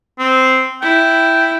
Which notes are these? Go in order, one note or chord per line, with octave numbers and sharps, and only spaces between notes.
C4
E4 G5